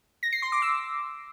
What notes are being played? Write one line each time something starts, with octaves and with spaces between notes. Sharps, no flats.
A#6
C7
C6
D6
E6